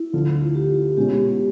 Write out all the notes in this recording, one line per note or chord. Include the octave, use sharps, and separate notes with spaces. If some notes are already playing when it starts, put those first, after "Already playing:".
Already playing: E4
D2 D3 F3 F4
G4
B2 G#3 C#4 G4